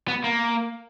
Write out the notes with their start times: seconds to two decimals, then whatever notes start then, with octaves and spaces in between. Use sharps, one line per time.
0.08 B3
0.24 A#3